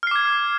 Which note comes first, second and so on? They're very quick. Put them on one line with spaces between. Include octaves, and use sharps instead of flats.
F6 C7 D6 G#6